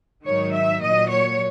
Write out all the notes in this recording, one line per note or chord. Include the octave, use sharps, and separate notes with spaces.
G#2 D#3 F#3 C#5
E5
A#2 F#3 D#5
C#5